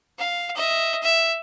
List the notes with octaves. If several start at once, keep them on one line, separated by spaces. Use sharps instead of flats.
F5
D#5 E5
E5